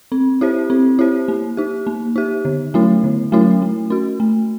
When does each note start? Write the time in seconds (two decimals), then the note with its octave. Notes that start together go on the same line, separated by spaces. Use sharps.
0.12 C4
0.41 E4 G4 C5
0.70 C4
0.99 E4 G4 C5
1.28 A#3
1.57 D#4 G4
1.87 A#3
2.16 D#4 G4
2.45 D3
2.74 F#3 A3 C#4 E4
3.04 D3
3.32 F#3 A3 C#4 E4
3.62 A3
3.90 C#4 F#4
4.20 A3